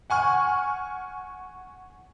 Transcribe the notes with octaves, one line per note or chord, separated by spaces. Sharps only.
F#5 G#5 C#6 F6